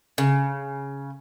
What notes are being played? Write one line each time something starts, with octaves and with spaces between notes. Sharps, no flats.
C#3